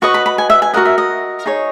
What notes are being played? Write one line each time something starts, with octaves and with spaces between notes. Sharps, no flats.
F#4 B4 D#5 C#6
B5
B5
G#5
E5
G#5
F#4 A#4 D#5 F#5
E5
D#5
D#4 G#4 C#5